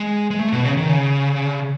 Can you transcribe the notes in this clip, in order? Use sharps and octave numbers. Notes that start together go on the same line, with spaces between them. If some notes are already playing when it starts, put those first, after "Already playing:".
Already playing: G#3
G#3
A3
B2
C#3
D#3
C#3